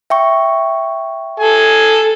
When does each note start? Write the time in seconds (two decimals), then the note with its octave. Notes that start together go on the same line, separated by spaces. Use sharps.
0.10 E5 G5 C#6
1.40 A4 G#5